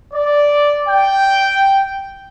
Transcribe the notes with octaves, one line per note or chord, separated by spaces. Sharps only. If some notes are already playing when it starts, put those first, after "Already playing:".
D5
G5